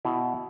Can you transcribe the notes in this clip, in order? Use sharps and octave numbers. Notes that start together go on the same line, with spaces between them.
B2 E4